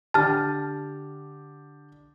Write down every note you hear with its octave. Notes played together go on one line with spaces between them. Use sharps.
D3 G4 A5 F6 A6